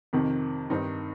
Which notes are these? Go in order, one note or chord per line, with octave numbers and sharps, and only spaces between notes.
F2 C3 D#3
G2 D#3 C4 D#4